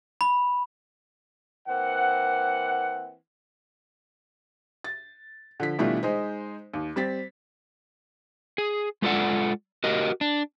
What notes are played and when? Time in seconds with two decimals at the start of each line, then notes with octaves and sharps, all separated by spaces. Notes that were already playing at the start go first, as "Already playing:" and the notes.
0.21 B5
1.68 E3 A#3 C4 F#5
4.84 A6
5.60 D3 F3 B6
5.79 B2 E3 G3 A3 D4 F4
6.03 G#3 D#4 C5
6.74 D#2
6.96 G3 C4 A6 B6
8.58 G#4
9.02 G#3 A3 F4 A4 D5 F#5
9.84 F#4 G4 A#4 D#5
10.21 D4